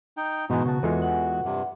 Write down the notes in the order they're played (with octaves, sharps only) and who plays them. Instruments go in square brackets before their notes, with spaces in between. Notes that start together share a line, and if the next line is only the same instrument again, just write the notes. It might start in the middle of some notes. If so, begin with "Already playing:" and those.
[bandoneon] D#4 G5
[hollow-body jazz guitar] G#2 E3 G#5 [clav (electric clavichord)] B2 [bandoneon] G#3 D#4 F#4
[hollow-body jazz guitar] C#3 A5 [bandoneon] F#4
[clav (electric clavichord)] E2 G#3 [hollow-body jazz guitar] F4 A4 B4
[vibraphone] F#5
[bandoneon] G2 C3